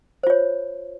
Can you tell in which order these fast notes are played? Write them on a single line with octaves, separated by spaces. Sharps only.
C5 F4 C#5